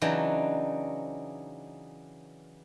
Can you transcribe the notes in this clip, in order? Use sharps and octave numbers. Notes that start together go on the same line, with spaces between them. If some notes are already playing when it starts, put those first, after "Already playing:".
C#3 E3 F#3 D4 D#4